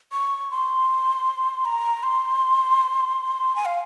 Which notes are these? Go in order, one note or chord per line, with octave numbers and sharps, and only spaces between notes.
C#6
C6
A#5
C6
G#5
F5